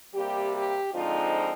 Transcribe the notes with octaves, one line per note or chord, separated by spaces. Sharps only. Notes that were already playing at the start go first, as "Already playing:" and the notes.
C3 G3 A#3 G4
G4
D3 F3 G#3 C4 D#4 F4